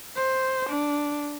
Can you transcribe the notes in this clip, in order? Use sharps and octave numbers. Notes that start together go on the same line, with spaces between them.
C5
D4